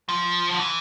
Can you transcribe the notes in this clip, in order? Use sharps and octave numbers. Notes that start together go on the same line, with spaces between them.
F3
D3
E3